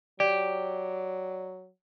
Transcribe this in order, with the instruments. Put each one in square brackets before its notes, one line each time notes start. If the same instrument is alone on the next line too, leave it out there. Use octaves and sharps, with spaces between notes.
[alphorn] F#3 [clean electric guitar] G4 [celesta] D5